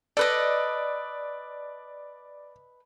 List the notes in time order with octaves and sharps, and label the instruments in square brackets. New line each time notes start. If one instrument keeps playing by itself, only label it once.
[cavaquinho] A4 B4 D#5 [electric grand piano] D5